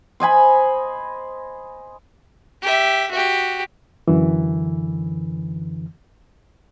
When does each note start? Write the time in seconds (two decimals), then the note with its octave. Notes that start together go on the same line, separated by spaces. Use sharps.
0.20 C5 D#5 G#5 B5
2.62 G4 E5
3.11 F#4 G4
4.08 F#2 D3 E3